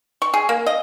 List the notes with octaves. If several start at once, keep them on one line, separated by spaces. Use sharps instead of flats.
C#6
G#4
A#3
D#5